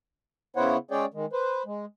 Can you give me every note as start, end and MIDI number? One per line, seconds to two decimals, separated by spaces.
0.56 0.77 49
0.56 0.77 59
0.56 0.77 64
0.56 0.77 72
0.56 0.77 73
0.56 0.77 78
0.91 1.05 56
0.91 1.05 61
0.91 1.05 68
0.91 1.05 73
0.91 1.05 74
0.91 1.05 79
1.14 1.26 51
1.14 1.26 56
1.33 1.63 71
1.33 1.63 72
1.66 1.85 56